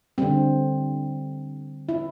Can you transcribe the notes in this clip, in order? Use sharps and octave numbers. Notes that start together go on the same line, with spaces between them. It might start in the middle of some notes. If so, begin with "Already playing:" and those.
D3 G3 C4
E4